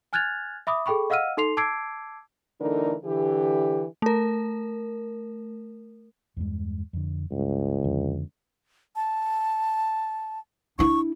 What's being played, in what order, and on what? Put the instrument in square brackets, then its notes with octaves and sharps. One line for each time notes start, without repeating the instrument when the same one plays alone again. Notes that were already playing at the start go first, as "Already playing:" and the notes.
[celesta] G#5 F6 F#6 G#6 A6 F7
E5 B5 D6 D#6
G#4 A4 G5 B5 C#6
D#5 F5 F#5 E6 F6 D#7
D#4 A4 C6 C7 F7
A5 D6 E6 G#6 C7 D7
[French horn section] D3 E3 A3 D4 D#4 A#4
D3 E3 G4
[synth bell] A3 A#4
[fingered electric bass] E2 G2 G#3
F2 D3
[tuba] C#2 [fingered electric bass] G2
[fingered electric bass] F2 D3
[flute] A5
[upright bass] D4 E4 [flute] C#6